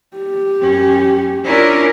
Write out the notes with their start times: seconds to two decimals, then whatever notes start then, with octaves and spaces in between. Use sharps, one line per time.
0.17 G4
0.60 F#2 C#4
1.45 C#4 D4 E4 F4 A#4